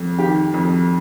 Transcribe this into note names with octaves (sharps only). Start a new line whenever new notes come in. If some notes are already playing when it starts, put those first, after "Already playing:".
Already playing: F2
D#3 G4
F2